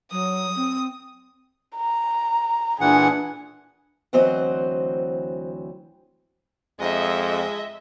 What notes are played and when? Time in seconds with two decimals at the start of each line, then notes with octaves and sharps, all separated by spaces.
0.12 F#3 D#6
0.56 C4
1.76 A#5
2.81 A#2 E3 D4 G#4 F#5
4.13 D2 E3 F#3 C4 C5 D#5
6.80 F2 G#3 D#5 E5